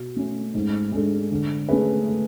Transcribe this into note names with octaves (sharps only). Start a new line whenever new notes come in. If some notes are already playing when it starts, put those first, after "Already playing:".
Already playing: B2
A3 C#4
G#2
G#3 D4 A4
D3
A3 C#4 G#4 B4